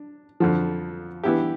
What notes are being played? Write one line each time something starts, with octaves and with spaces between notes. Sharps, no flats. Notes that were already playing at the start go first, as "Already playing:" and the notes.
Already playing: D4
F2 D3 F3
E3 B3 E4 G4